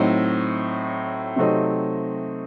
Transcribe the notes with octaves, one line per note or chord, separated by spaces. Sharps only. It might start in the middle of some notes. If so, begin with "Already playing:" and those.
Already playing: A2 F#3 C4 D#4
C3 F#3 A3 C4 D#4